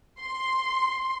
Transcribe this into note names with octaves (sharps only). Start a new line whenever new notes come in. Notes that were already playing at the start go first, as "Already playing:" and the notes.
C6